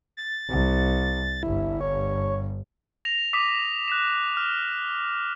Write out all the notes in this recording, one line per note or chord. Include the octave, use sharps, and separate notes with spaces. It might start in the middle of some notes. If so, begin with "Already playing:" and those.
A6
C2
G1 G2 E4
C#5
A#6 F7
D6 D#6 B6 D#7
F#6 B6 E7
F6